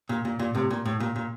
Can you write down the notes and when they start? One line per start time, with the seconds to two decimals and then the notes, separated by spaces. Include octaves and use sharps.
0.09 A#2
0.25 A#2
0.39 A#2
0.55 A2 C3
0.70 A#2
0.85 A2
1.00 A#2
1.16 A#2